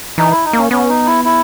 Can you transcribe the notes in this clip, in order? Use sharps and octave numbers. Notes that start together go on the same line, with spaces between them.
E3 D#4
E4
D#4
A#3 C#4
B3 C#4
D#4
E4
E4